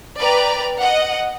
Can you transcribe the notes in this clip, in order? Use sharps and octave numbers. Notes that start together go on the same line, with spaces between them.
B4 D5 G5 A#5
D#5 F#5